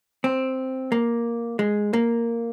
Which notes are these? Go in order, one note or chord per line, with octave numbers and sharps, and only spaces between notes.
C4
A#3
G#3
A#3